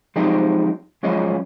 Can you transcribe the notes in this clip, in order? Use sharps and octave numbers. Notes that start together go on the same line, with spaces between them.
F3 F#3 G#3 C4 D#4 G4
F3 F#3 G#3 C#4 F4 D#5